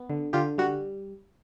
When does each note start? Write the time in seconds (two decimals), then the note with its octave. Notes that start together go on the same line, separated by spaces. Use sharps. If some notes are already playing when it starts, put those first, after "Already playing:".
Already playing: B3
0.10 D3
0.33 D3 F4 G4
0.58 G3 F#4